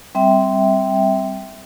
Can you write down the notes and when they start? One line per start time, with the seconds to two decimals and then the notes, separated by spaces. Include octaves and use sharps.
0.15 G3 C4 E5 G5